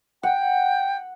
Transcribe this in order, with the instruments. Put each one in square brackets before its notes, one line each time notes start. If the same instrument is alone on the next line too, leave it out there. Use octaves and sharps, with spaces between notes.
[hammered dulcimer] F#5 [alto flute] G5